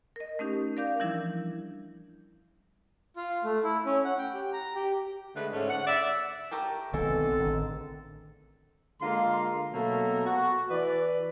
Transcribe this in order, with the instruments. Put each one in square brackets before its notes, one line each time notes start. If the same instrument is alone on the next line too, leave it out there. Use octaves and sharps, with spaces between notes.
[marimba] A#4 D#5
A3 C#4 D#4 G4
A#4 D5 F5 D6 G6
E3 F3 G3 D4 E4
[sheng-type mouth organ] F4
A3
E4
C#4
F#5
G5
G4
A#5
G4
[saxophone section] D3 G#3 A3 G#4 B4
G#2 D3 A3 C#4
F#5
D5 E5
[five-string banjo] A3 G4 A#4
[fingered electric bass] B1 D#3 B3 [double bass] D3 C4 [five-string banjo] G#3 [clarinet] A4
[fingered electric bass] A1 D#3
[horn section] D3 G#3 A#3 F4 A#5 C6
B2 F#3 A3 A#3 A4 A#4
F#4
E3 B4 D5